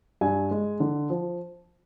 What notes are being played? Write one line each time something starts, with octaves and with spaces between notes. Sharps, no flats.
G2 G#5
G#3
D3
F3